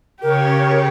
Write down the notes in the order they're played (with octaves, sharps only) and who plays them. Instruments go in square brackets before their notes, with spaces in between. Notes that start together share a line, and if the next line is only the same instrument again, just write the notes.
[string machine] C#3 C#5 [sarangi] G4 [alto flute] A#4